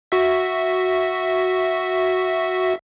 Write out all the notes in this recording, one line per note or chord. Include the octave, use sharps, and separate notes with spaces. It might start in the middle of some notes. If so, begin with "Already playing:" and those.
F#4 E5